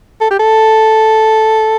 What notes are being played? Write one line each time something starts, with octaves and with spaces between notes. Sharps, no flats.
A4
G4
A4